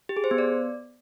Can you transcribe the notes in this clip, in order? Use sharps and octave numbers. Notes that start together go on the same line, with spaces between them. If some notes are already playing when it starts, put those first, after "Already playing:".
G4
G#4
C5
B3
D5